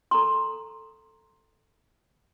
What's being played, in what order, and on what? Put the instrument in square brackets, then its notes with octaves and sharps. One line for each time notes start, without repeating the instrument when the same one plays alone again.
[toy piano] A4 A#5 C6